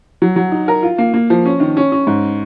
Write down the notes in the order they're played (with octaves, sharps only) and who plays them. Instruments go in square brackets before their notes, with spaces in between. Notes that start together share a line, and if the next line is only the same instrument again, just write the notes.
[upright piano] F#3
F#3
D#4
A#4
F4
A#3
A#3
F3
C#4
D#3
C#4
C#4
G#2